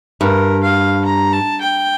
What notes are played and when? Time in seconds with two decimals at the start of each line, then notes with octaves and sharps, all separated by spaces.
0.21 G2 A#4
0.63 F5
1.05 A#5
1.33 A5
1.61 G5